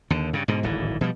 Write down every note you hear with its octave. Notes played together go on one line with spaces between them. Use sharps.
D#2 D3
G2 C#3
G#2 B2 D3
D1 G#1 G#2 E3
B2 F3 G3